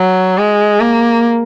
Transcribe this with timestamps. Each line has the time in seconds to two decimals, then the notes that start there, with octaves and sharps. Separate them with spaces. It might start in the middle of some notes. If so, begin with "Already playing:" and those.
Already playing: F#3
0.38 G#3
0.81 A#3